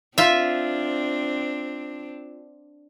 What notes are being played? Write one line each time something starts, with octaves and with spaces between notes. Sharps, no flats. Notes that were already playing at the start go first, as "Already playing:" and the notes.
C4 D4 F4 E5